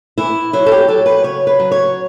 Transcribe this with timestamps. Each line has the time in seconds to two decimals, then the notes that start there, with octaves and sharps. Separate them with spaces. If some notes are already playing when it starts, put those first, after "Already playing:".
0.18 E3 E4
0.53 F#3 E4
0.66 A4
0.72 G4
0.88 F#3 A4
1.06 B4
1.23 C#3 C#5
1.47 B4
1.59 F#3
1.71 C#5